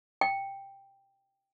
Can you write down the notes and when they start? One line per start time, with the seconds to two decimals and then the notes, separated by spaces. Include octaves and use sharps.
0.21 G5